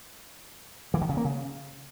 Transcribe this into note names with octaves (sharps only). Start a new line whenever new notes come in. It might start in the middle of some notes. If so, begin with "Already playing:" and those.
E3
D#3
C#3
A#3
C#3